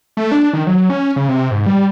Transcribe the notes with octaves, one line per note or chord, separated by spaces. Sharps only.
A3
D4
D#3
F#3
C#4
C#3
C3
G#2
G3